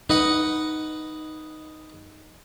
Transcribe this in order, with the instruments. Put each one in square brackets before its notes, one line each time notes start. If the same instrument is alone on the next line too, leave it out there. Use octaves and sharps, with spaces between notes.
[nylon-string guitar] D#4 [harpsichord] B4 D#5 F#5